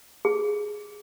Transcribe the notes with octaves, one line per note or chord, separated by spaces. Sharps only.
G#4